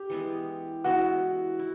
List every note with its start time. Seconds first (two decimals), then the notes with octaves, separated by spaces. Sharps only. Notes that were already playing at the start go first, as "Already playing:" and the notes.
Already playing: G4
0.10 E3 G#3 B3 E4
0.84 E3 G#3 B3 E4 F#4
1.59 E4